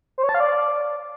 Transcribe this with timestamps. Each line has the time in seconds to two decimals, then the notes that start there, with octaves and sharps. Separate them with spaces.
0.18 C5
0.23 C#5
0.29 A5
0.34 F5
0.40 D5